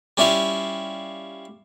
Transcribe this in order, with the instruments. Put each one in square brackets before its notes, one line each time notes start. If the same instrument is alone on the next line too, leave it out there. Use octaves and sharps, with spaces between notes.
[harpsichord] G3 C#4 E4 F4 F5